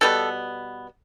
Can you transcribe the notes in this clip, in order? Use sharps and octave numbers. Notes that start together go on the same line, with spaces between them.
B2 G3 B3 A4